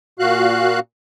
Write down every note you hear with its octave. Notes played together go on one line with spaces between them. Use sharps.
A#2 F#4 F5 F#6